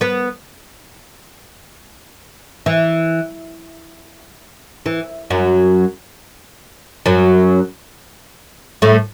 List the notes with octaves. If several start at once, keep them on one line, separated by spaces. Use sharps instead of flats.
B3 B4
E3
E3
F#2 F#3
F#2 F#3
A2 A3